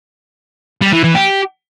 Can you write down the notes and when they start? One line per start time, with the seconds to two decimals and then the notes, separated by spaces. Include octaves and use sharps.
0.81 G3
0.92 E3
1.04 E3
1.15 G4